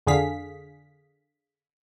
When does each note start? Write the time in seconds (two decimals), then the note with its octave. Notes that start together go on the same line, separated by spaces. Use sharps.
0.07 F2 D3 G#4 F5 B6